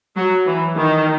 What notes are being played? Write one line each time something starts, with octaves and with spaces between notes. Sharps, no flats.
F#3
E3
D#3